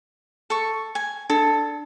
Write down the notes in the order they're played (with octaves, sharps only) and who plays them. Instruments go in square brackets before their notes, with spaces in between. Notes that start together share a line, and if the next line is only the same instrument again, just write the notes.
[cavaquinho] A4 C#6
G#5
[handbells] D4 [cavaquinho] A4